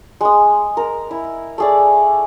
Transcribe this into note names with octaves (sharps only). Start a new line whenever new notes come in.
G#3 D#6
A#4
E4
A3 G#4 D5